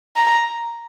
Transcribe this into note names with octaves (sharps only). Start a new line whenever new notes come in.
A#5